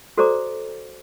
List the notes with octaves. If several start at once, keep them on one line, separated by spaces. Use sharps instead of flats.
F#4 A4 C5 D5 A#5 D6